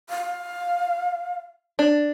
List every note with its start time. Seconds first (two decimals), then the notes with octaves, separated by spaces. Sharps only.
0.10 F5
1.79 D4